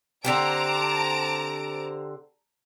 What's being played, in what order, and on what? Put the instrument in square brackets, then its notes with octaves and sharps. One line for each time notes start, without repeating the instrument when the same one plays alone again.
[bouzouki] D3 C4 G4 [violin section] A5 A#5 D7